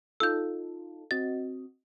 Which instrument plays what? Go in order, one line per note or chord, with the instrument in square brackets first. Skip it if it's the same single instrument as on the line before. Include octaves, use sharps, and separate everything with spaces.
[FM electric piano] D#4 F4 A4 [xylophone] E6 G6
[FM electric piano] C4 F#4 D#5 [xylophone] A6